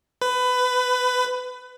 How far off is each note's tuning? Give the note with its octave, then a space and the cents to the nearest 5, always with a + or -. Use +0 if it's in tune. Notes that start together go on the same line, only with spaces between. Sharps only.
B4 +20